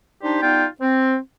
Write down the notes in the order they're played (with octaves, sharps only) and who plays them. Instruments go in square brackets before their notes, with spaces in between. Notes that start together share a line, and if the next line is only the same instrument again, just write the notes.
[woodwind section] G3 D4 D#4 G4 C5
G3 B3 D#4 F4 G5
C4